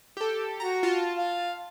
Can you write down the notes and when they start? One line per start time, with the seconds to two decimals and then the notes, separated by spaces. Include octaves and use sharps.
0.17 G4 A4
0.60 F#4 A#5
0.83 F4 A5
1.16 F5